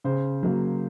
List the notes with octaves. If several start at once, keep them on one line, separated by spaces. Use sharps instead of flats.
C#3 C5
F#3 A#3